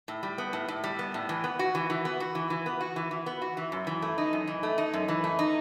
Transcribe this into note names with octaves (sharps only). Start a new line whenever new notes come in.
A2
G3
B3
A2
A2
G3
B3
A2
E3
B3
F#4
E3
E3
B3
F#4
E3
E3
B3
F#4
E3
E3
B3
F#4
E3
F#2
E3
A3
D#4
F#2
E3
A3
D#4
F#2
E3
A3
D#4